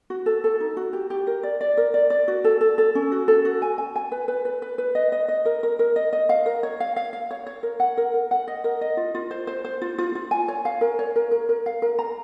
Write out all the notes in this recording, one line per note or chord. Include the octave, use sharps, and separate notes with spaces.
F#4
A4
A4
D#4
F#4
G4
G4
A#4
D5
D5
A#4
D5
D5
F#4
A4
A4
A4
C#4
F#4
A4
F#4
G#5
G#5
G#5
B4
B4
B4
B4
B4
D#5
D#5
D#5
A#4
A#4
A#4
D#5
D#5
F5
A#4
C#5
F5
F5
F5
C#5
C#5
A#4
F#5
A#4
A#4
F#5
D#5
A#4
D#5
F4
F4
C5
C5
C5
F4
F4
F4
G#5
C#5
F5
A#4
C#5
A#4
A#4
A#4
F5
A#4
A#5